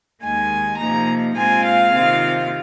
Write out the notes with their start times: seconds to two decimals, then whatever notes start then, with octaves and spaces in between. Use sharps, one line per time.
0.21 D#2 D#3 G#3 G#5
0.78 C3 F3 A#3 D#4 A#5
1.36 A#2 G#3 C4 F4 G#5
1.64 F5
1.93 C3 D#3 C4 F4